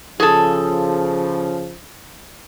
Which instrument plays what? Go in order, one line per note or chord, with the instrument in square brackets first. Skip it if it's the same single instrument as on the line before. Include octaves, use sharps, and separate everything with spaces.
[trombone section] C#3 F3 [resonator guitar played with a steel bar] G#4 A4